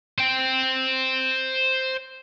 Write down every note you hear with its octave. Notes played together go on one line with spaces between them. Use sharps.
C5 G5